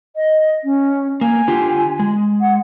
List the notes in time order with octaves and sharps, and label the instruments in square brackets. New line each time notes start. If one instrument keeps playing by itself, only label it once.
[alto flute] D#5
C#4
[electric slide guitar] A#3 [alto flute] G#5
[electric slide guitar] D3 F4 G4
G#3
[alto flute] F#5